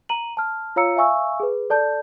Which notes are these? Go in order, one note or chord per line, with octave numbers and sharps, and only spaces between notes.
A#5 D#7 F#7
A5 F6
F4 C#5 F5 A#5 E6 C#7
E5 F5 G#5 C#6 E6
G#4 B4
A4 D5 A5 G6